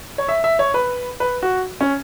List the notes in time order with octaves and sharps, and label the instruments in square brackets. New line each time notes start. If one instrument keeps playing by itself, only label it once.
[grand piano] C#5
E5
E5
C#5
B4
B4
F#4
C#4